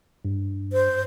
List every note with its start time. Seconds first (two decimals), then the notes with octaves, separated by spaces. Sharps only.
0.25 G2
0.73 C5